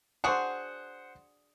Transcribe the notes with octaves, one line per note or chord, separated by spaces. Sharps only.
D4 F#4 G#4 C5 F#5